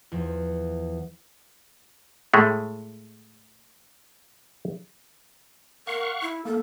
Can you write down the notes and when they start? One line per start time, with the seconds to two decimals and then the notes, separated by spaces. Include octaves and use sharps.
0.12 E2 F3
2.34 A2 G#3 A3
5.87 A#4 F5 F#5 C#6
6.22 E4
6.45 A#3 A4